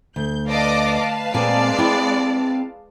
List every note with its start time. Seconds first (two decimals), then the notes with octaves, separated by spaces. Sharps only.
0.16 D2 G6
0.49 B4 D5 D#5 F5 A5 D6
1.34 A#2 G#3 C4 D5 G#5
1.78 C4 E4